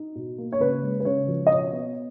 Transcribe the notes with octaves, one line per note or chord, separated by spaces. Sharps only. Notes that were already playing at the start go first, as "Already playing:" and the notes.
Already playing: D#4
B2
A#3
C#5
C#3 B4
G#3
B4
C#3 C#5
F3
D#5
B2 C#5
B3